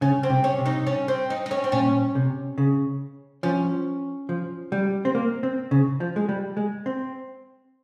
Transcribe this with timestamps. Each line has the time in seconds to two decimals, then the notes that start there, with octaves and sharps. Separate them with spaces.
0.01 C#3 C#4
0.23 C4
0.30 C3
0.44 C#4
0.58 C3
0.66 D#4
0.87 C#4
1.08 C4
1.30 D#4
1.46 D#4
1.51 C#4
1.64 C4
1.72 A#2 C#4
2.15 C3
2.58 C#3
3.43 F3 C#4
4.29 F3
4.72 G3
5.05 C4
5.15 A#3
5.43 C4
5.71 C#3
6.00 F3
6.16 G#3
6.29 G3
6.57 G#3
6.86 C4